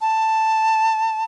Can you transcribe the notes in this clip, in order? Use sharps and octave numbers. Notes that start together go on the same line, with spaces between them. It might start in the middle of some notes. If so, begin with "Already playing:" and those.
A5